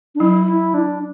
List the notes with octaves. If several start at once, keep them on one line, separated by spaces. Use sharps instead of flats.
D4
F#3 E4
E4
D4